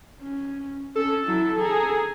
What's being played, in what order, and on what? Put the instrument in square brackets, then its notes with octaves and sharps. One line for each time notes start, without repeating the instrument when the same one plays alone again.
[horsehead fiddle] C#4
[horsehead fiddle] C#4 [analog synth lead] A4
[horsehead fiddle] F#3 E4
G#4 A#5